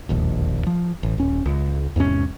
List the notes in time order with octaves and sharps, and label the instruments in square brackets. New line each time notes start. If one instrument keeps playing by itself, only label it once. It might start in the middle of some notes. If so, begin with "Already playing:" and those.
[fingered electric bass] E1 A#1 D#2
F3
A1
D#1 C#4
C#2
E2 G#2 C3 C#4